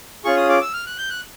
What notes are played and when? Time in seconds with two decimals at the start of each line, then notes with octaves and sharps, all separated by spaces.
0.25 C#4 F4 G#4 C#6
0.37 D#6
0.49 D6
0.61 E6
0.73 F6
0.86 F#6
0.98 G6
1.10 F#6